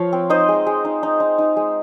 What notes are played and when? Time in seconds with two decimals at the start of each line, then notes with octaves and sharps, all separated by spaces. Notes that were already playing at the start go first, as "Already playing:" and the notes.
Already playing: F3 C#5 F5
0.13 C4
0.30 D#4 C5 D#5
0.48 G#3
0.67 G#3
0.85 D#4
1.03 D#4
1.20 D#4
1.38 D#4
1.57 G#3